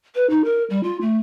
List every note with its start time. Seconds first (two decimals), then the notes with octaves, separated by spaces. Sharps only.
0.15 B4
0.30 D#4
0.45 A#4
0.70 G3
0.83 F4
1.01 A3